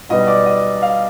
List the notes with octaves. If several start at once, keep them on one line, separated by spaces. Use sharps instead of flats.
B1 B2 G3 B3 D#5
D5
D#5
F5